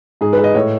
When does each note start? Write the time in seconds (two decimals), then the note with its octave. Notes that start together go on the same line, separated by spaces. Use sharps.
0.21 G#2 G#4
0.33 G#3 B4
0.44 D#5
0.54 A2 C#5